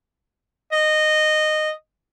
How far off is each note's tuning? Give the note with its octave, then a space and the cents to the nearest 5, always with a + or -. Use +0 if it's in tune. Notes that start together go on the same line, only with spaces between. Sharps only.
D#5 -15